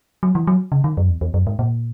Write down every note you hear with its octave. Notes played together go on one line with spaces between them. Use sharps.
F#3
E3
F#3
C#3
D#3
F#2
E2
E2
F#2
G#2
A#2